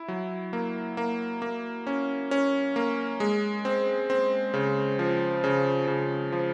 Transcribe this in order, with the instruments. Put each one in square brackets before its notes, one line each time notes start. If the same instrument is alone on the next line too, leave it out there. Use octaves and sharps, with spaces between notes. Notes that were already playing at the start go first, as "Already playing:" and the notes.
Already playing: [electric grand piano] E4
F#3
A#3
A#3
A#3
C#4
C#4
A#3
G#3
C4
C4
C#3
F3
C#3
C#3
F3